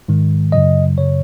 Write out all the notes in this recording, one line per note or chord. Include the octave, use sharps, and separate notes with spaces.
G#2 D#3 G#3
F#2 C#3 F#3 D#5
F#2 C#3 F#3 C#5